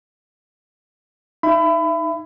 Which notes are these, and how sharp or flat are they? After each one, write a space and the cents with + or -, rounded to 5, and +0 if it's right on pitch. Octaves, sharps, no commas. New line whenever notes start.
D#4 +0 E5 +30 B5 +25